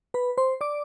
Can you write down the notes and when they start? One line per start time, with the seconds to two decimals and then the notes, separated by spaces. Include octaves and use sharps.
0.14 B4 B5
0.37 C5 C6
0.61 D5 D6